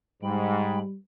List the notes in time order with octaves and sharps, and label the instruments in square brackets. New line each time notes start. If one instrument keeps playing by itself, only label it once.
[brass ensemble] G#2 [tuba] G3 [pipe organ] G#3 G5 B5